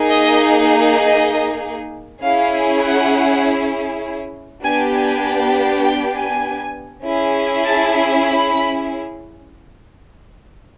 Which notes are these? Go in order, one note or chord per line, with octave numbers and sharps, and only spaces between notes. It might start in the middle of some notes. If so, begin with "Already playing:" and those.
Already playing: A#3 D#4 G#4
D#5
D#5
C#4 E4 G#4 F5
F#5
B3 D4 G4 G#5
G#5
G5
G#5
C#4 E4 G#4
A5
B5